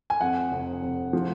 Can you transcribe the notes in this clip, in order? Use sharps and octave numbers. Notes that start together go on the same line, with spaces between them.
G#5
F2 F#5
F1
F1
F3